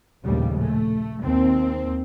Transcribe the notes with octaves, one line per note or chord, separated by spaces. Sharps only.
A#1 D#2 A2 C#3 G3
A3
D#2 C4